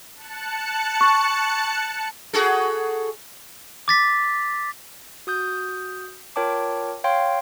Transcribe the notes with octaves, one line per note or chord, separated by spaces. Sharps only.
A5 F#6 C#7
C#6
F#4 G#4 A4
D6 A6 B6
F#4 D#6 G6
F4 A#4 C#5 G5 A5 D6
C#5 F5 G5 C6